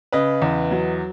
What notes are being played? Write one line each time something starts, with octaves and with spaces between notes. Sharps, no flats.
C#3 B4 D#5
E2
F#3